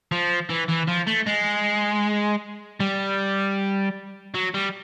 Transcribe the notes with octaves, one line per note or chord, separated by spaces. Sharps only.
F3
E3
E3
F3
A3
G#3
G3
F#3
G3